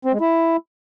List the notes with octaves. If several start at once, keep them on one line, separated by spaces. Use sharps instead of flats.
C4
G#3
E4